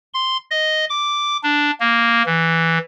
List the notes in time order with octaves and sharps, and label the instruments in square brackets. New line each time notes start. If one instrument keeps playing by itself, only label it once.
[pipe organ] C6
D#5
D6
D4
A#3
E3